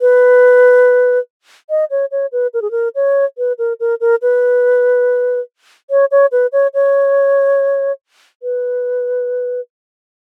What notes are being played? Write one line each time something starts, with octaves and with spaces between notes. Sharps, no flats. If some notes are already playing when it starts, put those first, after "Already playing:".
B4
D#5
C#5
C#5
B4
A#4
G#4
A#4
C#5
B4
A#4
A#4
A#4
B4
C#5
C#5
B4
C#5
C#5
B4